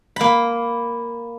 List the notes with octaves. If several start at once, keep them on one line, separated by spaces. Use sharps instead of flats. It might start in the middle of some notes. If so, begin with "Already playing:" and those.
A#3 B5